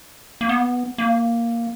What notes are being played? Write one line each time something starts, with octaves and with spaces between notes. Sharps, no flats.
A#3
B3
A#3